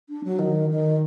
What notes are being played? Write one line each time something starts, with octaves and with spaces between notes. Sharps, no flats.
D4
F#3
D#3
D#3